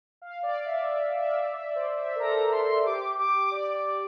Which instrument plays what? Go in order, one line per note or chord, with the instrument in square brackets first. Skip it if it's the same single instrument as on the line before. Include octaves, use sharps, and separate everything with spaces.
[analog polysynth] F5
D5
E5
E5
E5
E5
D5
C5
E5
A#4
[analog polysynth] A4 [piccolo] A#5
[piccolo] C6
[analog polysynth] G4 [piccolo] D6
[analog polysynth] G4 [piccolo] D6
[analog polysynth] D5
[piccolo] D6